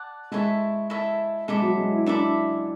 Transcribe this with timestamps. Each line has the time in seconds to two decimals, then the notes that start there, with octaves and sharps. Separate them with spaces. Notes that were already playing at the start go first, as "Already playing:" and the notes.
Already playing: D5 F#5 A5
0.31 G#3 E4 A4 C#5 E5
0.90 E4 A4 C#5 E5
1.48 G#3 A4 E5 B5 D6
1.62 F#3
1.77 G#3
1.92 E4
2.06 D4 A4 E5 B5 D6